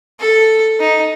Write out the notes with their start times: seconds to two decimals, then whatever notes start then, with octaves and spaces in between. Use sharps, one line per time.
0.20 A4
0.80 D#4